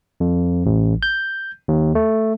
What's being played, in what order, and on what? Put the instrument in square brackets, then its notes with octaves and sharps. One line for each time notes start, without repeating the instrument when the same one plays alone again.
[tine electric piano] F2
A1
G6
D#2
A3